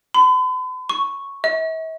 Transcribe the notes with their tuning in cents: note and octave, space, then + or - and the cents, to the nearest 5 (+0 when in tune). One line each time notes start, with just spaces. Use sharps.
B5 +45
C#6 -5
E5 -45